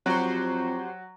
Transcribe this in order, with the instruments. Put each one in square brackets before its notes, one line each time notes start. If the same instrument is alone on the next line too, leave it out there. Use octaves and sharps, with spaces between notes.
[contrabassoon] F2 [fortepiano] F#3 [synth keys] F#4 G4 C5